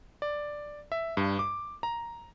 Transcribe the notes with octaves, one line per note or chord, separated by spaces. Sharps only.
D5
E5
G2
D6
A#5